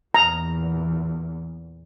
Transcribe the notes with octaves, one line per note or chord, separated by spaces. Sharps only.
E2 A#2 A#5